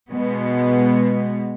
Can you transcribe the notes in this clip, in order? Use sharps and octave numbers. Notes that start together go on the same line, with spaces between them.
B2 G#3 B3